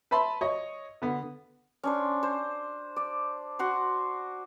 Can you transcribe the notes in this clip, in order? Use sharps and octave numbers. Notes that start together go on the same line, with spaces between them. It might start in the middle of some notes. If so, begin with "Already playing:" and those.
B4 E5 A5 B5 C6
C#5 D#5
D3 B3
C#4 D4 C5
C5
D5
F#4 F#5 C6